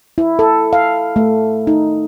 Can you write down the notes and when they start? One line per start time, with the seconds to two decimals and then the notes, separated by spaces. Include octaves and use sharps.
0.18 E4
0.39 A4
0.73 F5
1.16 A3
1.67 D#4